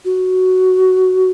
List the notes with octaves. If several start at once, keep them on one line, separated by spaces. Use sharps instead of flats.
F#4